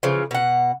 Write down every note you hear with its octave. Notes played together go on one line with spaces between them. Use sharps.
C#3 E3 F3
B2 F#5